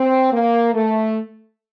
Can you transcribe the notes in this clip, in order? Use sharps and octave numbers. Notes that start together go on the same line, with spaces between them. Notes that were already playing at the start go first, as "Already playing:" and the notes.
Already playing: C4
A#3
A3